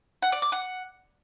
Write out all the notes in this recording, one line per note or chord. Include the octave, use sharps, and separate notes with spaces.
F#5
D5
D6
F#5